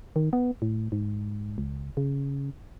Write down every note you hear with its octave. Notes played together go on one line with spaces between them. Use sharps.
D#3
B3
A2
G#2
C#2
C#3